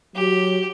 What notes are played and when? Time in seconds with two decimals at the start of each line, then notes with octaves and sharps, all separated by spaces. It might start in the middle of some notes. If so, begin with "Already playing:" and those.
0.15 F#3 G4